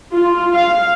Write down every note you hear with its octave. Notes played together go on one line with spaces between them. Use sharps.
F4
F5